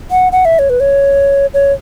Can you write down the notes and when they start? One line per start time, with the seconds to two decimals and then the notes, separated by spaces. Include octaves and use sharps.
0.11 F#5
0.32 F#5
0.45 E5
0.59 C#5
0.70 B4
0.80 C#5
1.54 C#5